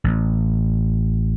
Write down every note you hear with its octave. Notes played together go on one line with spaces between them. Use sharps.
A1